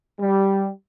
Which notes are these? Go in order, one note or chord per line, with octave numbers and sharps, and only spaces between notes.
G3